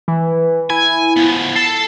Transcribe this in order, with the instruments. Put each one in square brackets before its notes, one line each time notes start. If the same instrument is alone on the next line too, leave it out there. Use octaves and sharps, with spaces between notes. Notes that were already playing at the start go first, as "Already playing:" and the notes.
[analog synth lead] E3
[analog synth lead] E4 [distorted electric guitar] G#5
[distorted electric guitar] F3 B3
[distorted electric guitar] A4 A5 [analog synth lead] C7